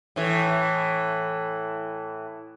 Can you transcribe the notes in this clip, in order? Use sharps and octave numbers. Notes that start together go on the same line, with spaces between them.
A2 E3 A3